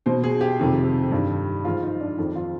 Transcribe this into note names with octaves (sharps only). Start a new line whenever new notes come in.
B2 C5
G#4
G4
F2 C3 D#3
G2 D#3
G#2 F3 F4
D#4
D4
F2 D#3
F4